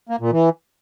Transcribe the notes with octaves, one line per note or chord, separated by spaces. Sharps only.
A#3
A#2
E3